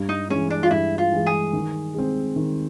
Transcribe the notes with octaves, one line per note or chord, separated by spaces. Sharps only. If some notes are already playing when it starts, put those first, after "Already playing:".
Already playing: G2
D#4
E3 G#3 C#4
D4
F4
G2 E4
F4
E3 G#3
G#4
D#3
G#3 C4
D#3